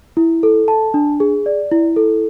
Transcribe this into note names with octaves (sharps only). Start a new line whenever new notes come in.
E4
A4
A5
D4
G#4
D5
E4
A4